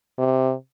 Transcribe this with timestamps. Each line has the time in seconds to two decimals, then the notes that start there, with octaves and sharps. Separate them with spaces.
0.18 C3